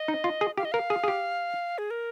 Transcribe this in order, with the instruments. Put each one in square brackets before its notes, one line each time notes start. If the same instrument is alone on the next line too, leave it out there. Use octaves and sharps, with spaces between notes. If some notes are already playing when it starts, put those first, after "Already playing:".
Already playing: [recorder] D#5
[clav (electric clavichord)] D#4
F4
G#4
[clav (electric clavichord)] G4 [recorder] F5
[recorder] D#5
[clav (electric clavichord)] A#4 [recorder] F5
[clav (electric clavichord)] G#4
G#4
G4
[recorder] G#4
A#4